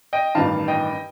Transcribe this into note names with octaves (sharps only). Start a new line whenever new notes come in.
D#5 G5
A1 G2 D#3 F5 A5
D#5 G5